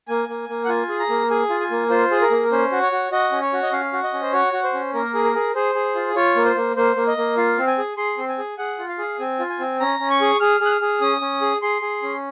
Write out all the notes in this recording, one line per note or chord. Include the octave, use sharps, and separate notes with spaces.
A#3 G#5
A#3
A#3
F#5
F4 G#5
G#4
A#5
A#3
G#4 G#5
F4
G#5
A#3
F4 C5
G#4
A#4
A#3
C#4 C5
F#4
C#5
F#4
F#4 D#5
C#4
C#5
F#4
D#5
C#4 F5
F#4
D#5
C#4
C5
F#4 C#5
F#4
C5
C#4
A#3 A#4
G#4
A#4
G#4
G#4 C5
G#4
F4
F4 C#5
A#3
C5
A#3
A#3 C5
A#3
D#5
A#3
F4 F5
C4
G#5
G#4
G#4 C6
C4
G#5
G#4
G#4 F#5
F4
F5
G#4
C4 G#5
F4
G#5
C4
C#4 A#5
C#4
C#6
G#4
G#4 F6
G#4 F#6
F6
G#4
C#4 D#6
C#4
G#4
G#4 C6
G#4
C#4